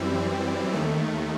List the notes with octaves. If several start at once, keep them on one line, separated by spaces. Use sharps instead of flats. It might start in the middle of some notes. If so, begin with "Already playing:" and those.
Already playing: F#2 E3 G3 C4
D#2 D#3 A3